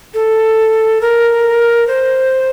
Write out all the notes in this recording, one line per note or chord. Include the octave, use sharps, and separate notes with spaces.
A4
A#4
C5